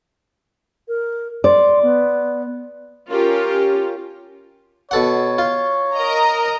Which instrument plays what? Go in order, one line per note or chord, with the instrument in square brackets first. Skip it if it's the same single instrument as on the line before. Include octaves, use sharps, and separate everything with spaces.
[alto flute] A#4
[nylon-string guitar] D5 [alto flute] C6
[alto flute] B3
[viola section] C#4 F4 G4 A#4
[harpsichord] B2 A4 F#5 [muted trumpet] C#5
[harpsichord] F4
[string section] A#4 D#5 A#5